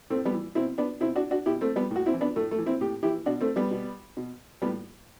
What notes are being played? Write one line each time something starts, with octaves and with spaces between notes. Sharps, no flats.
A2 A3 C4
G3 B3
E3
B2 C4 E4
B3 D4
B2 C4 E4
D4 F#4
D4 F#4
B2 E4 G4
A3 C4
G3 B3
A2
F#4
C4 E4
E3
B3 D4
A2 A3
A3
E3
C4 E4
A2 G4
E3 E4 G4
B2 D4 F#4
A3 C4
G3 B3
B2
B2
A2 G3 B3